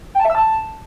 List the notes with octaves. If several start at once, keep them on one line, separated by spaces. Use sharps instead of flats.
G5
A5
E5
E6
A5